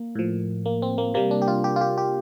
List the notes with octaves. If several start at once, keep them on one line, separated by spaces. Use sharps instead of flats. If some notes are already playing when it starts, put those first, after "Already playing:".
Already playing: A#3
A2 F3
A#3
C4
A#3
C3 G3 A#3
D4
G4
F4
G4
F4
G4
G4